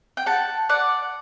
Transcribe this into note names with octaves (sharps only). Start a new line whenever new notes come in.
G5
F#5 A5
D5 F#5